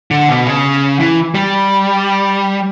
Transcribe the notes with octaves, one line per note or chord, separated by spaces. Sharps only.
D3
B2
C#3
E3
G3